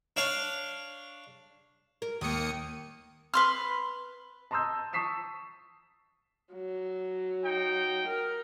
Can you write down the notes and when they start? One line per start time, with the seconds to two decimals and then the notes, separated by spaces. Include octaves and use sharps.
0.17 D4 C#5 F5
2.02 A#4
2.21 D#2 D#3 A#3 D#6 C#7
3.34 B4 C6 F6
4.51 A5 A#5 C6 D#6 E6 G6
4.93 A5 C#6 D#6 B6 C7 E7
6.53 F#3
7.44 D#4 G5
8.07 A#4